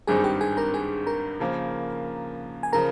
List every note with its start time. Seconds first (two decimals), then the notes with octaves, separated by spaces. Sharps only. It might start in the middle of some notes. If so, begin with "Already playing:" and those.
0.07 G#1 G2 G3 C4 D#4 G#4 G#5
0.24 G4 G5
0.41 G#4 G#5
0.57 A#4 A#5
0.74 G#4 G#5
1.07 A#4 A#5
1.40 C#3 F3 A#3
2.63 G#5
2.73 C#3 F3 A#4 A#5